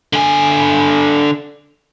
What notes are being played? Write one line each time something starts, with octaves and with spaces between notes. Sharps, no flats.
D3 G#5